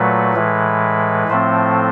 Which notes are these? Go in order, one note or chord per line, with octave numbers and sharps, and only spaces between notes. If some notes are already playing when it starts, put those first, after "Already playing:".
Already playing: A#2 F#3 A3 B4
A2 E3 G#3
A2 F3 A3 C4 C5